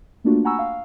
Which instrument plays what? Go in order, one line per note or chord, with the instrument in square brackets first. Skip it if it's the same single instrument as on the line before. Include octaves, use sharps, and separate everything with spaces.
[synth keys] A3 A#3 D4 F4 F#4
F#5 G#5 A#5 B5 C#6 E6
F5